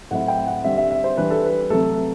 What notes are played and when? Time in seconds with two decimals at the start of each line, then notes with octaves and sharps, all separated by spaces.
0.11 A2 F#3 C4 E4 F#5
0.28 G5
0.47 F#5
0.64 D3 G3 C4 E5
0.77 E5
0.91 E5
1.04 C5
1.17 E3 G3 D4 B4
1.30 A4
1.44 B4
1.70 C3 F#3 A3 A4